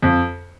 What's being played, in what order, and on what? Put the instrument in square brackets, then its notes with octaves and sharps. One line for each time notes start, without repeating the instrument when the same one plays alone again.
[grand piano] F2